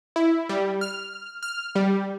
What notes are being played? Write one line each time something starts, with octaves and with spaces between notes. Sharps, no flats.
E4
G3
F6
F6
G3